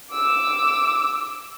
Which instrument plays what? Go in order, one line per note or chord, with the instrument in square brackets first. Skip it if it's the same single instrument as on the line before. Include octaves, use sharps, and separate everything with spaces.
[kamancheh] D6 E6